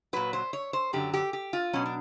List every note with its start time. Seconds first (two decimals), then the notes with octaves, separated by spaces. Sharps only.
0.13 A#2 F#3 B4
0.33 C5
0.53 C#5
0.73 C5
0.93 F#2 D3 F#3 G4
1.13 G4
1.33 G4
1.53 F4
1.73 B2 F#3 C#4
1.86 D4